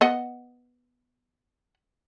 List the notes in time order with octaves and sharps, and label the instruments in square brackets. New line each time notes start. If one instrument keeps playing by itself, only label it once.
[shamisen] B3 D#5 F#5